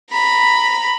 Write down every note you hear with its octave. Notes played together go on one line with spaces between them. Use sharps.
A#5 B5